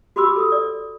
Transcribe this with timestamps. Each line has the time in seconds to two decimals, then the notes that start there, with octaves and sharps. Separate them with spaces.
0.16 F#4 G4 B5 C6 D6 E6
0.36 A4 D#6
0.52 D5